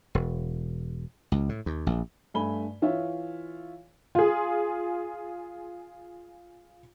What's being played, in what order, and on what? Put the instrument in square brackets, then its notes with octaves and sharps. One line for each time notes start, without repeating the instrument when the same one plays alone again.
[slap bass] E1
C#2
A2
D#2
A#1
[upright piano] G2 A3 G#5 B5 G7
E3 F4 C#5 E5
[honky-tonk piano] F4 G#4